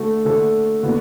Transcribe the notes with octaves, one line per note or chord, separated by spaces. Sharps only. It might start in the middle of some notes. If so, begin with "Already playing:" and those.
Already playing: D3 A3 F#4 A4
D3 A3 F#4 A4
D3 B3 F#4